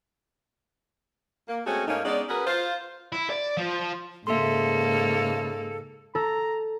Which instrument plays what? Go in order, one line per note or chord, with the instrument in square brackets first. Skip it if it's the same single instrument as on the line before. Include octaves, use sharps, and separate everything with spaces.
[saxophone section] A#3
G#3 A3 C4 C#4 F#4 G#4
G#2 A3 A#3 C#4 D#4
G#3 B3 C#4 D#4 D5
C#4 F#4 G#4 A#4 B4
F4 C5
[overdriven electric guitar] E4
D5
F3
[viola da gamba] G#2 A#3 [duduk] C#3 [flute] A4 [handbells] E5 C6
[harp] A4 [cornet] A#5